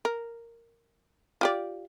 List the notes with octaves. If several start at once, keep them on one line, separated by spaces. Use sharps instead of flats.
A#4
F4 G4 D5